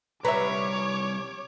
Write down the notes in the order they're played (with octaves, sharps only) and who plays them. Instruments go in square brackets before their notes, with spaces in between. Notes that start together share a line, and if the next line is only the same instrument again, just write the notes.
[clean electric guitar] C2 G3 A#5 [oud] B4 E5 [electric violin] C#5 D6